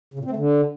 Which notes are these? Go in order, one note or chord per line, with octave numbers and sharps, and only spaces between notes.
C#3
A#2
C4
A3
D3